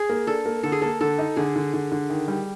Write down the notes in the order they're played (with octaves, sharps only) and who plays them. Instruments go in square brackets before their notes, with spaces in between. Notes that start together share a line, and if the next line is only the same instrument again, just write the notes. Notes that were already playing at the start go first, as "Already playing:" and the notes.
Already playing: [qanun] G#4
[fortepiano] A#3
[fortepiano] D4 [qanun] A4
[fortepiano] A#3
[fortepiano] D3 [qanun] A4
[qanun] G#4
[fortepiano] A#3 [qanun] A4
[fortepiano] D3 [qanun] A4
[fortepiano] D#4
[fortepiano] D3 [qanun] G#4
[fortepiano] D3
D3
D3
D#3
G3